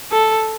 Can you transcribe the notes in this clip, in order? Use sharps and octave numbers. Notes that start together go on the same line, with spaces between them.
A4